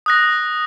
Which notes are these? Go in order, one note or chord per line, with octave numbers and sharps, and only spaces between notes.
D#6 F#6 A#6